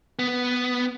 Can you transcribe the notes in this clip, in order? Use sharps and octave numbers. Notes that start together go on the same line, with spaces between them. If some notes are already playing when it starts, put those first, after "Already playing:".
B3